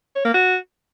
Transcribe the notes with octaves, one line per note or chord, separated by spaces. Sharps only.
C#5
A#3
F#4